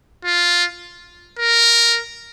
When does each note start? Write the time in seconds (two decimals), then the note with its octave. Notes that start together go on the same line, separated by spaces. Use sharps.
0.25 F4
1.39 A#4